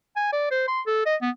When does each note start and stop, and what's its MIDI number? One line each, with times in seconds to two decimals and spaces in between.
0.16 0.32 80
0.32 0.47 74
0.51 0.64 72
0.68 0.81 84
0.86 1.04 69
1.06 1.16 75
1.22 1.30 59